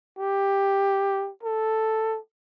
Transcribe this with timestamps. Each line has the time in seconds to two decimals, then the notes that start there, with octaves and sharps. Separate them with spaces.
0.18 G4
1.43 A4